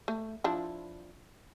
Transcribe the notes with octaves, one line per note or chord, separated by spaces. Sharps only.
A3
F3 D4 E4